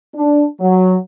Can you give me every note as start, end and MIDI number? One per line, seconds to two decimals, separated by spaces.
0.15 0.46 62
0.60 0.95 54